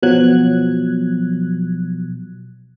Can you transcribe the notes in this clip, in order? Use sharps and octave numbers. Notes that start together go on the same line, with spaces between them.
B2 F3 F#3 F#6 G#6